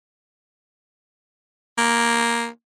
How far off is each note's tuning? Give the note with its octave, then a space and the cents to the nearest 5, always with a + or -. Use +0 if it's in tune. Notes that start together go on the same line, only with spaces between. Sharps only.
A#3 +5